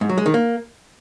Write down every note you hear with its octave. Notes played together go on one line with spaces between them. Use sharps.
G#2
F#3
G#3
D#3
A#3